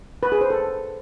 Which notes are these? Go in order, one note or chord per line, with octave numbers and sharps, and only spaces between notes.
B4
G#4
C5
A4